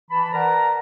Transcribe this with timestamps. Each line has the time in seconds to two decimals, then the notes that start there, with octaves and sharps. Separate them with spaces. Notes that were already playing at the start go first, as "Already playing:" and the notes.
0.11 E3 A5 B5
0.33 A#4 B4 D5 F#5 A5 A#5